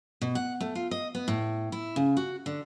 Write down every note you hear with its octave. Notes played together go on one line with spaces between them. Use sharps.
B2
F#5
A3
F4
D#5
B3
A2
E4
C#3
F#4
D3